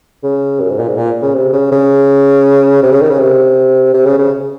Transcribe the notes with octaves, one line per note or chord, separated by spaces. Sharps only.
C#3
F#2
G#2
A#2
G#2
A#2
C#3
C3
C#3
C#3
C3
C#3
D#3
C#3
C3
C3
C#3
C#3